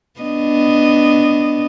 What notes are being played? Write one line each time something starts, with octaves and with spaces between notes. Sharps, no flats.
B3 D4 D#5